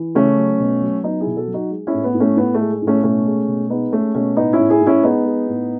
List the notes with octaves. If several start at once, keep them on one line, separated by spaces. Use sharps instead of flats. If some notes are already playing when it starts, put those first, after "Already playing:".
Already playing: E3
C#3 A3 C#4
F#3
B2
F#3
F#3 B3 D#4
E4 G#4
B2
F#4 A4
F#3
D#4 F#4
G#3
C#4 E4
A2
B3
A2
A3 C#4
A2 B3
A3
G#3
A2
A3 C#4
B2 A3 C#4
G#3
B2
G#3 B3 D#4
G#3 A3 C#4
B2 A3 C#4
A2 B3 D#4
C#4 E4
A2
E4 G#4
A2
C#4 E4
G#3 B3 D#4
G#3
A2